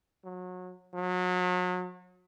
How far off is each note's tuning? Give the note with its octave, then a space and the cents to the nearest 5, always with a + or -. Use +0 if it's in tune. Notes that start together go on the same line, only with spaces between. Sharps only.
F#3 -25
F#3 -35